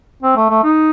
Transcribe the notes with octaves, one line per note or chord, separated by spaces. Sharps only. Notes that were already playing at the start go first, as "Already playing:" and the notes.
C4
A3
A3
D#4